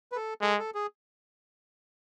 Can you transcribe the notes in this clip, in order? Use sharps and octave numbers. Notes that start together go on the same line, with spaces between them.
B4
A4
G#3 A4
A4
G#4